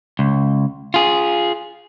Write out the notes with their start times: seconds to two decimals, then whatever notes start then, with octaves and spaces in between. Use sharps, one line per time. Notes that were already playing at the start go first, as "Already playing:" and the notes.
0.19 C#2
0.94 F4 G#4